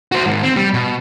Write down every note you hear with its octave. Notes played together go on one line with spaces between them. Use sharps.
F#4 C5
G#2 D#3
C4
G3
B2